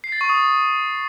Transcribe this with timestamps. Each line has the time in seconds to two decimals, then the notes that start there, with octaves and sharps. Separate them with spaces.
0.04 C7
0.12 A6
0.21 C#6
0.29 D#6